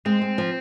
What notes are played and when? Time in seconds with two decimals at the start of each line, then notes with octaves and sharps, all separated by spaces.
0.06 G#3 C4
0.22 G#3
0.38 F3